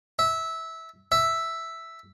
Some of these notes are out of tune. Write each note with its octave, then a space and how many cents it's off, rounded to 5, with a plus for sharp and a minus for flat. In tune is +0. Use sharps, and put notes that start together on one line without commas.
E5 -15
E5 +0